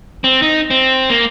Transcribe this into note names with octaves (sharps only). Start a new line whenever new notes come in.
C4
D#4
C4
A#3